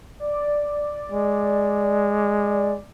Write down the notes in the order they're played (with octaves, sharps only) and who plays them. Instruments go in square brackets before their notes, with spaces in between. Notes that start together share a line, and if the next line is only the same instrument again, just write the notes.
[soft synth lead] D5
[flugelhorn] G#3